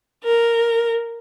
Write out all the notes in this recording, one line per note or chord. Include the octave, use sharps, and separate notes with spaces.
A#4